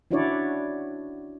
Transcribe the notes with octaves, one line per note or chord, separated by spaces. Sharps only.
C#4 D4 E4 F#4 C#5 D5